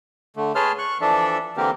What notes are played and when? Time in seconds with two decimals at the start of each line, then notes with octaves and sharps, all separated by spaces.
0.36 D3 A3
0.55 G#4 B4 C#5 A5 C6 F6
0.78 C#6 F#6
1.01 E3 F3 D4 A4 D5 E5
1.57 D3 E3 A#3 C4 G4 A#4